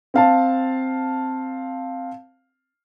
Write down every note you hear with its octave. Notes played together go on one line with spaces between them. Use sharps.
C4 F5 A5